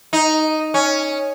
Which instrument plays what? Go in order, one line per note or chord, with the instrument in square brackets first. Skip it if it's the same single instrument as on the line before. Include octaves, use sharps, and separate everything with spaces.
[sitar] D#4
C#4